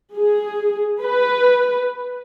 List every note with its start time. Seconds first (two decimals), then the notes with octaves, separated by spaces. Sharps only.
0.16 G#4
1.03 B4